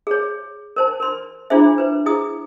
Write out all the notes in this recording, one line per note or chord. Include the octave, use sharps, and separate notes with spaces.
G#4 C#5
A#4 C5 A5
A#4 C6
D4 E4 F4 G#4 C5 E5
B4 C5
E4 G#4 D#6